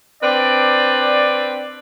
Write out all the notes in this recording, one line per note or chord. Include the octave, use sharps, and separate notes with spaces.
C4 D4 B4 D5